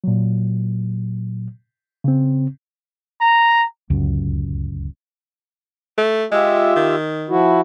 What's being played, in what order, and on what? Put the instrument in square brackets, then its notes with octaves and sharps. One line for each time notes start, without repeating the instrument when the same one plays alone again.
[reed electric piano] A#2 F#3
C#3 C4
[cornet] A#5
[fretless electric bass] D1 C#2 F#2
[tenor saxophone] A3
[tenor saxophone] G#3 [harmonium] F4 G4 E5
[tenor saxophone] D#3
[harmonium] F3 E4 F#4